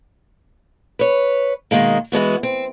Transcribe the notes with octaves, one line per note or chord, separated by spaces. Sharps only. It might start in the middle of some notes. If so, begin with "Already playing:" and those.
B4 C#5
B2 D#3 G#3 A#3
E3 G#3 B3 F#4
C4